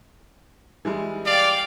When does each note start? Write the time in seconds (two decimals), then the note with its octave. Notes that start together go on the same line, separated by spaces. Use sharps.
0.85 E3 G3 G#3
1.26 D5 F5 G5